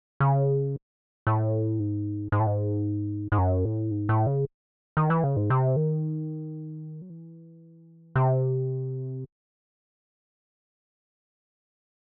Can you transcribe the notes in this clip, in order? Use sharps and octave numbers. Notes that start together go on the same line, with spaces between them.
C#3
A2
G#2
G#2
A2
G#2
G#2
F#2
A2
G#2
A2
C#3
D#3
E3
C#3
G#2
C3
D#3
F#3
E3
C3